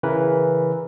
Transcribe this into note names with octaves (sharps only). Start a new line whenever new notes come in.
C#3 E3 C#4 A#4 B4